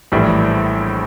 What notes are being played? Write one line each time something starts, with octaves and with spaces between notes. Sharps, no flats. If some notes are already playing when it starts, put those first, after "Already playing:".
A#1 A2 E3 G3